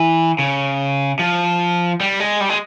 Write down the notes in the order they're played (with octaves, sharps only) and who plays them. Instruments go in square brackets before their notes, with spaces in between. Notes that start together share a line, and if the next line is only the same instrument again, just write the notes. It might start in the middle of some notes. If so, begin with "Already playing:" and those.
Already playing: [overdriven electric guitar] E3
C#3
F3
G3
G#3
G3
G#3